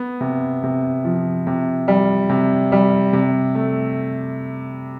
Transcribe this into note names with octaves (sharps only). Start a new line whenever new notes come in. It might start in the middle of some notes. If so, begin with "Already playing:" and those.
Already playing: B3
C3
C3
F3
C3
G3
C3
G3
C3
A3